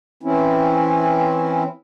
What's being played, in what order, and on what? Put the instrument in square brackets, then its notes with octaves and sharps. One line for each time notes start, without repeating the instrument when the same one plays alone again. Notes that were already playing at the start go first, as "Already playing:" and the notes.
[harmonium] E3 C4 C#4 E4